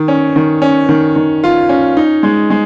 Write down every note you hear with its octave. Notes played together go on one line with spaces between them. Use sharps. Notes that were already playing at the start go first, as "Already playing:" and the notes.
Already playing: D#3
C#4
D#3
C#4
D#3
D#3
F4
C#4
D#4
G#3
G#3